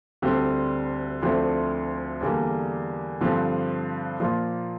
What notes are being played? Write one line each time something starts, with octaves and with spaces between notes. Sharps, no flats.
D2 D3 G3 C4
D2 D3 F3 A3 C4
E2 D3 G3 A#3
G2 D3 F3 C4
A#2 F3 A#3 F4